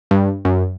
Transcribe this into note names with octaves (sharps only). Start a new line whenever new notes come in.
G2
F#2